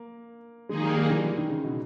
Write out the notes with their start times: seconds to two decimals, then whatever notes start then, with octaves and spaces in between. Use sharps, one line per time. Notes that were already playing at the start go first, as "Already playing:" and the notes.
Already playing: A#3
0.69 D#3 G#3 A#3 D#4 G#4
0.82 G3
0.96 G3
1.10 E3
1.17 G3
1.24 E3
1.37 D#3
1.50 C#3
1.64 B2